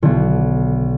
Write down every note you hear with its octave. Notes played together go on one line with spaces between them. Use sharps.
B1 D3